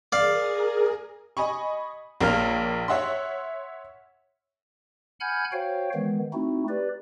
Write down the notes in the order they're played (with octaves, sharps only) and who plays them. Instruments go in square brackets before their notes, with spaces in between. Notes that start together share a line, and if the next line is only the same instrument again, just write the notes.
[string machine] G#4 A#4 [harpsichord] D5 F5
[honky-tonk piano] D#5 G#5 B5 C#6
A#1 A#3 A#4 C#5 F5 F6
C#5 E5 F#5 C6
[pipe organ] F#5 G#5 B5 F6 G6 G#6
F#4 C5 C#5 F5 G5
D#3 E3 G#3 B3
A3 C4 D#4 E4 F#4
G4 B4 D5